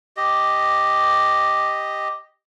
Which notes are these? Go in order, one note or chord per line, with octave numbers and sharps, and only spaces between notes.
G4 D#5